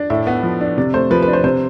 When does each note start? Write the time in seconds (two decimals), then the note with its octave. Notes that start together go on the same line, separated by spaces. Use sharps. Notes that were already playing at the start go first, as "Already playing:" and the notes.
Already playing: D4
0.10 A2 E5
0.27 B3
0.43 F3
0.61 D4
0.78 C3 D5
0.94 A3 C5
1.11 F3 B4
1.22 B4
1.28 D4
1.33 C5
1.44 C3 C5